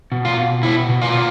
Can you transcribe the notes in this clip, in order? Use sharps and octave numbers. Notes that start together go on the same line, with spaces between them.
B2
F4
B2
B2 E4
B2
F4
B2